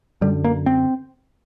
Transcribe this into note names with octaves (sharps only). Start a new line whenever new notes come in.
F#2 D3 G3
A#3
C4